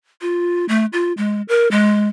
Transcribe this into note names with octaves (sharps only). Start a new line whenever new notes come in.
F4
A3
F4
G#3
A#4
G#3